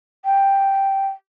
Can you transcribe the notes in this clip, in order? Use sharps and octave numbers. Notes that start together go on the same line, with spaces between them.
G5